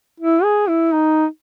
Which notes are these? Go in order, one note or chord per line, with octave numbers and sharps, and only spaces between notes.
E4
G#4
E4
D#4